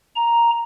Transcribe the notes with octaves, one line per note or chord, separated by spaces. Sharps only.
A#5